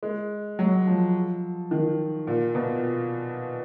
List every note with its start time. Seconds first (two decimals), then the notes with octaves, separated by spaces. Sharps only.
0.03 G#3
0.59 F#3
0.87 F3
1.71 D#3
2.27 A#2
2.55 B2